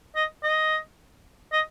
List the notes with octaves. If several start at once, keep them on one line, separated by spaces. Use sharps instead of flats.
D#5
D#5
D#5